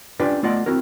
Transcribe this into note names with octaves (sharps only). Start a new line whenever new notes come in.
C#4 D4 F4 G4 B4 D5
A3 B3 F4 D5 D#5 F#5
C4 E4 F#4 A#4